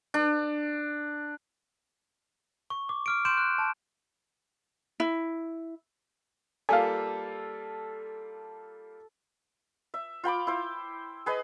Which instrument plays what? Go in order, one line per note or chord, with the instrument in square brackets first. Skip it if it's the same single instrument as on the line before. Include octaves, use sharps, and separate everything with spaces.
[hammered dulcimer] D4
[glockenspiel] C#6
D6
D6 F6 D7
C6 G6 D7 E7
F#6
A5
[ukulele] E4
[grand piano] G3 A#3 F4 [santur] A4 [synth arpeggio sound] F5 G#5
[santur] E5
F4 G5 B5 D6
E4 C5
G#4 B4 D#5